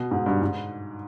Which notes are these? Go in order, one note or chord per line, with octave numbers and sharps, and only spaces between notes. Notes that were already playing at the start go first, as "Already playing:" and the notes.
Already playing: B2
G#2
G2
G#2